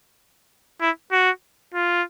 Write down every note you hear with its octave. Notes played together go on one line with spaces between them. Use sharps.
E4
F#4
F4